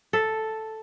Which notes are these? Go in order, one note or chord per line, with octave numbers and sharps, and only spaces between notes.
A4